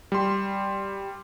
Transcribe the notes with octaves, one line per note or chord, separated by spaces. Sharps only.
G3 C6